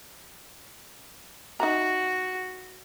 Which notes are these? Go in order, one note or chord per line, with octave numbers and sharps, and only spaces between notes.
D#4 F#4 E5 A#5